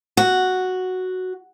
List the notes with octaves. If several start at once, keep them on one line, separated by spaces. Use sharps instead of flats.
F#4